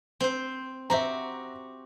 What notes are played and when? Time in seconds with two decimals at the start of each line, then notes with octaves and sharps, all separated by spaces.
0.20 C4 C5
0.90 C4 F#4 G4 E5 A#5